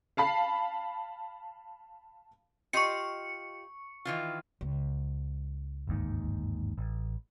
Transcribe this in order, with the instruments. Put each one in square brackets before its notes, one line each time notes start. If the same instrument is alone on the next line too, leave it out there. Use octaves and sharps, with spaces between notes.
[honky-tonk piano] F5 A5 B5 C7
[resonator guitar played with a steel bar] F4 G4 D#5 [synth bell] C#6 C#7
[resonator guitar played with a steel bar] D#3 E3 F4
[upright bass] C#2
[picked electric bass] G1 D#2 G#2
A1